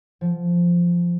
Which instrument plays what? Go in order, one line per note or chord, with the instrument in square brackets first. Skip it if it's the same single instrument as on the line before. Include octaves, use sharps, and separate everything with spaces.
[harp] F3